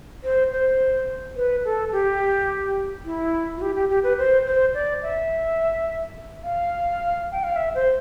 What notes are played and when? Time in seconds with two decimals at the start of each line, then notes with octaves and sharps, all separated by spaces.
0.24 C5
0.52 C5
1.36 B4
1.65 A4
1.92 G4
3.05 E4
3.57 F4
3.62 G4
3.75 G4
3.90 G4
4.03 B4
4.18 C5
4.46 C5
4.74 D5
5.02 E5
6.44 F5
7.32 G5
7.44 F5
7.56 E5
7.75 C5